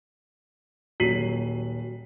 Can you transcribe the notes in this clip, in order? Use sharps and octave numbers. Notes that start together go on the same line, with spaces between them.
D#1 F#3 B6 C7 D#7 F#7